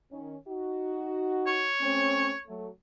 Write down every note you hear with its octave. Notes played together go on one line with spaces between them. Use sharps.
D#3 C#4
D#4 F#4
C#5
A3 C4 C#4
F#3 A3